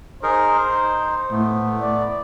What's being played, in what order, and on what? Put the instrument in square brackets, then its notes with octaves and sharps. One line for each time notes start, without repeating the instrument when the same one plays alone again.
[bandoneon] D#4 G#4 A#4 [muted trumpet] C5
[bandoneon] D#4
[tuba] A2 [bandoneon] A3 B3
[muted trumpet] D5